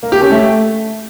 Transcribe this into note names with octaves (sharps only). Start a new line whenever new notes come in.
A#3
G4
C#4
A3